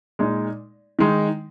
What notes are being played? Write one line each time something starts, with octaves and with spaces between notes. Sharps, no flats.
A#2 G#3 D#4
D#3 G#3 D#4